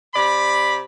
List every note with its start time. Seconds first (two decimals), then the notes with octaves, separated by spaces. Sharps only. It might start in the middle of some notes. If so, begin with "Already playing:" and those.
0.14 C3 D5 B5